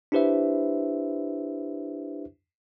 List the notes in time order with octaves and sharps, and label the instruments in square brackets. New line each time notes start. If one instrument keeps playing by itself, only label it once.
[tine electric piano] D4 E4 G4 B4 C5 E5